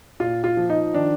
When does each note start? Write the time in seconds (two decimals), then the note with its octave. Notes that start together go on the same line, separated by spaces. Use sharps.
0.20 A#2 F4
0.44 F4
0.57 F3
0.70 D#4
0.94 D#3 D4